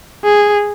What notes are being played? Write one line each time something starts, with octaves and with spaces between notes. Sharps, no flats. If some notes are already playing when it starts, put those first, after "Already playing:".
G#4